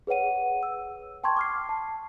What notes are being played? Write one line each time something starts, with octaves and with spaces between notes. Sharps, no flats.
G#4 B4 C#5 F#5 D#7
E6
G5 A5 C6 C#6 G#6
D6 F6 C7
A5